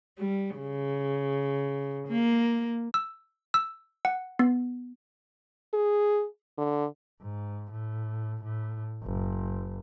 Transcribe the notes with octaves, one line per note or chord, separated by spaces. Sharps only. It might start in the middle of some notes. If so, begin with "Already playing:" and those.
G3
C#3
A#3
E6
E6
F#5
B3
G#4
D3
G#2
A2
A2
F#1